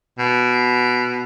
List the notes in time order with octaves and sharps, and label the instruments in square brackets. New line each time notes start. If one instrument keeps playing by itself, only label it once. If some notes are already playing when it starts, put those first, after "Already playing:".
[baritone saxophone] B2